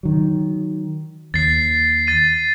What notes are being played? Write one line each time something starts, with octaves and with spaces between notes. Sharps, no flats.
D#3 F#3
D#2 A6 C7
A6 D#7